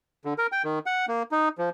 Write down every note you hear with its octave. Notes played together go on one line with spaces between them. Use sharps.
D3
A#4
G5
D#3
F#5
A#3
D#4
F3